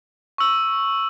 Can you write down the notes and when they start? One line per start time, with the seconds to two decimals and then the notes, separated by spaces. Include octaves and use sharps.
0.38 C#6 E6